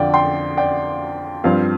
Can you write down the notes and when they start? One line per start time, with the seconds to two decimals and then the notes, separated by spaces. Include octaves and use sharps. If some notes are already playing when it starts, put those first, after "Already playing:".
Already playing: F2 D3 F3 D5 G5
0.14 G5 C6
0.57 D5 G5
1.44 G2 F3 C4 F5